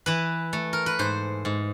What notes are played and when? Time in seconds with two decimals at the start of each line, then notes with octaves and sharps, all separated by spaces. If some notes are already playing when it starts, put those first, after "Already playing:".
0.06 E3 B4
0.53 A3
0.73 A#4
0.86 B4
0.99 G#2 C5
1.45 G#2